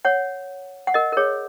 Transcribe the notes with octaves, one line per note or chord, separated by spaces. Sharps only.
C#5 F#5
F#5
A#4 D#5
A#4
G#4 C#5